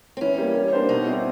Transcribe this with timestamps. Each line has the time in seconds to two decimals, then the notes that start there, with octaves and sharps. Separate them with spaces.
0.17 C4
0.21 E3 C#4
0.38 G3 A#3
0.55 G3
0.73 A#3 D4 G4 C5
0.89 B2 D#4
1.05 G3 C4 E4 G4